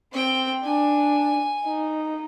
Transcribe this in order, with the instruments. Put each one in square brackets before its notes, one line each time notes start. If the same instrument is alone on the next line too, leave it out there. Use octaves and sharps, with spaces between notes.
[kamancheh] C4 [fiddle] G5
[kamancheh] D4 [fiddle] G#5
[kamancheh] D#4